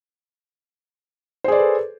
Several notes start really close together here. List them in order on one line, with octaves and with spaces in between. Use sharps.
C5 G#4 D5 B4 A4